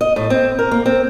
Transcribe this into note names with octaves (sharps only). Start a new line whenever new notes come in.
D#5
A2
C4
A#4
A#3
C4